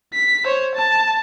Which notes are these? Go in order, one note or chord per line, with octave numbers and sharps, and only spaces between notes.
B6
C5 C#5
A5